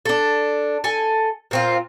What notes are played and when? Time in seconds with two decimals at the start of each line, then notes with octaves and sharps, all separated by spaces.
0.05 D4 A4
0.84 A4 G#5
1.51 A#2 C4 F4